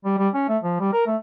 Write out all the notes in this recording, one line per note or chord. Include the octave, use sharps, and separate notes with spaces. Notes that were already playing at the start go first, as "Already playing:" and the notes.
G3
G3
C#4
A3
F3
G3
A#4
A3